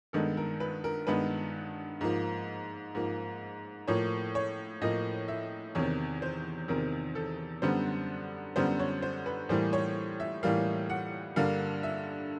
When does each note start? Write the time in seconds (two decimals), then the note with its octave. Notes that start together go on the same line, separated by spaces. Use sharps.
0.13 G2 D#3 G#3 B3 A4
0.37 A#4
0.60 B4
0.84 A#4
1.07 G2 D#3 G#3 B3 B4
2.01 G#2 F3 A#3
2.95 G#2 F3 A#3
3.88 A2 F3 A#3 C#5
4.35 C#5
4.82 A2 F3 A#3 D#5
5.28 E5
5.75 E2 C3 D#3 C#5
6.22 C5
6.68 E2 C3 D#3 A#4
7.15 A4
7.62 F#2 D3 G3 B3 C5
8.56 F#2 D3 G3 B3 C5
8.79 C#5
9.02 C5
9.26 B4
9.49 A2 E3 G3 A#3 C5
9.73 C#5
10.20 E5
10.43 A2 E3 G3 A#3 F5
10.90 F#5
11.36 G2 D3 G3 A#3 F5
11.83 E5